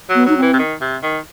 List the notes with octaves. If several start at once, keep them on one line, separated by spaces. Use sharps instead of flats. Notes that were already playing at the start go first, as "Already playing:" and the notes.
F#3
B3
F#3 D#4
C4
E3
C3
D#3
C3
D#3